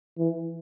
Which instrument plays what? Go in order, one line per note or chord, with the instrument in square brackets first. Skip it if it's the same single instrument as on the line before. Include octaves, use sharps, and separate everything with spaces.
[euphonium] E3